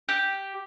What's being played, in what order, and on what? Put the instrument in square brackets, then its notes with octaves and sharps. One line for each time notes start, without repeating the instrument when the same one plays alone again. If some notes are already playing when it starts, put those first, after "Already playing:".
[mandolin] G4